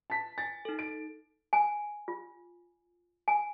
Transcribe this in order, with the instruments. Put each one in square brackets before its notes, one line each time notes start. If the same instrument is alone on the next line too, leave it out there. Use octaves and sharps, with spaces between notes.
[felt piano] A5 B6
[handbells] G#5 [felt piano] A6
[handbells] D#4 A4
[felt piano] D7
[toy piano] G#5
F4
G#5